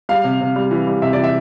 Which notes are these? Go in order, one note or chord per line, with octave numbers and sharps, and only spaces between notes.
G3 F5
C3
C3
G3
E3
G3
C3 E5
E3 D5
E5